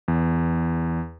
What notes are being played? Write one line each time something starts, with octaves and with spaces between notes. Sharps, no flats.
E2